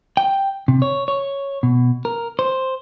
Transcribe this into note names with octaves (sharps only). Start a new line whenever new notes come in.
G5
C3
C#5
C#5
B2
A#4
C5